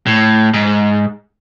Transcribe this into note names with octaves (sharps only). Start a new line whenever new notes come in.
A2
G#2